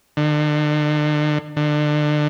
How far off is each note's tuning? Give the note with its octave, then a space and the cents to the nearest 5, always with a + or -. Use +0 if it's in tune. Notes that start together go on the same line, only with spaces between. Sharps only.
D3 +40
D3 +30